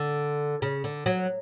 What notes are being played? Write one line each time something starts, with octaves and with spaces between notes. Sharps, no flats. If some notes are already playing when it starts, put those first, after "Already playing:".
Already playing: D3
C#3
D3
F#3